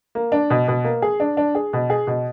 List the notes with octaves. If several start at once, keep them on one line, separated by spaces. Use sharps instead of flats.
A#3
D4
B2
B2
A#3
G#4
D4
D4
G#4
B2
G#4
B2